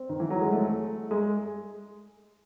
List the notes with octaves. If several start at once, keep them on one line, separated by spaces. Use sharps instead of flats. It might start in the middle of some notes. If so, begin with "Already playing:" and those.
Already playing: C4
D#3
E3
F#3
G#3
A3
G#3